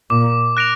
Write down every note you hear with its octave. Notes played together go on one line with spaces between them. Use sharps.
A#2 D6
F#6 A#6 D7 F7